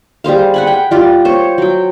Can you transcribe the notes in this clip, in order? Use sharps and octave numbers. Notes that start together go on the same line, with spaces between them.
G3 G#4 C5 F5
F#5 G#5 B5
G5
G3 F4 D5
C5 C#5
F#3 G5